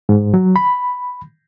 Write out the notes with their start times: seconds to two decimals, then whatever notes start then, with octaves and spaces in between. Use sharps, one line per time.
0.09 G#2
0.34 F#3
0.56 B5